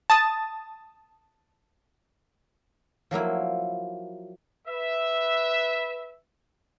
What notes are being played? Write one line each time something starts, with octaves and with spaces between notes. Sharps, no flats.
A5 D#6 A6
F3 F#3 A#3 E4
B4 E5